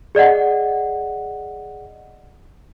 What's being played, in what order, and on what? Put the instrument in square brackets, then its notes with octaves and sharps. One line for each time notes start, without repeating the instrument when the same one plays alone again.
[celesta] G#4 D5 D#5 F#5